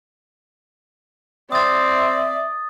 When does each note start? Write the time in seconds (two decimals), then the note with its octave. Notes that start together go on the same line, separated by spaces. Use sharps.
1.52 C4 D5 E5 D#6 A6